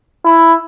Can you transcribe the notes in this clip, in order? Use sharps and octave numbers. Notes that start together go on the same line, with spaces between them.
E4